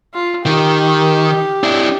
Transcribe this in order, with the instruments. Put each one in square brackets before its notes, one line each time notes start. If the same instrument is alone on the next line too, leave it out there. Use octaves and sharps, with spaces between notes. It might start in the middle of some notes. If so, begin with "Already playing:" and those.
[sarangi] F4
[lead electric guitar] D#3 [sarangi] G4
[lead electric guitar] D4 E4